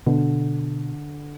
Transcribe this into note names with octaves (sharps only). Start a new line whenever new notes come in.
B2 D3